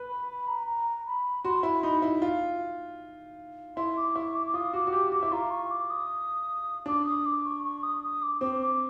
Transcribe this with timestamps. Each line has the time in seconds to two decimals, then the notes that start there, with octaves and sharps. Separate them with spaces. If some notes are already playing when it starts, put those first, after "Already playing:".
Already playing: B4
0.09 B5
0.28 B5
0.47 A#5
0.66 A#5
1.06 B5
1.44 F#4 C6
1.63 E4 B5
1.82 D#4 B5
2.02 E4
2.22 F4
3.76 E4 C6
3.96 D6
4.16 E4 C#6
4.34 D6
4.46 D6
4.54 F4 D#6
4.73 F#4 D6
4.87 F#4
4.92 G4 D6
5.12 F#4 D6
5.23 E4
5.32 F4 A#5
5.50 C#6
5.70 D6
5.90 D#6
6.86 D4 D6
7.05 D#6
7.25 D6
7.44 C#6
7.64 C#6
7.82 D#6
8.03 D#6
8.22 D6
8.41 C4 D6
8.60 D6